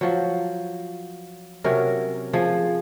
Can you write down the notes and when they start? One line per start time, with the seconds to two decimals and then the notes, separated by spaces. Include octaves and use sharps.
0.01 F3 F#3
1.64 C3 F#3 C#4 A#4
2.33 F3 G#4